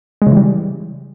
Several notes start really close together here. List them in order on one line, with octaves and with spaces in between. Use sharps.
G#3 C#3 E3 G3